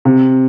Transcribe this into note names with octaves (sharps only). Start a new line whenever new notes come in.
C3